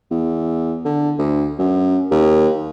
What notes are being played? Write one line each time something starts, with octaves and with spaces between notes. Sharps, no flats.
E2
D3
D2
F#2
D#2